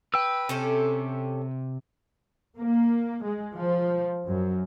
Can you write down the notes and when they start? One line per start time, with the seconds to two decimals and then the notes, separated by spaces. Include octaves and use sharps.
0.14 B4 G5 E6
0.49 C3 C#4 G4 A4
2.57 A#3
3.23 G#3
3.55 F3
4.27 F#2